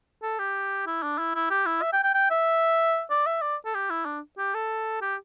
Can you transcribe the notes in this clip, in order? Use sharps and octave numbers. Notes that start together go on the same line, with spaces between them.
A4
G4
E4
D4
E4
E4
G4
E4
E5
G5
G5
G5
E5
D5
E5
D5
A4
G4
E4
D4
G4
A4
G4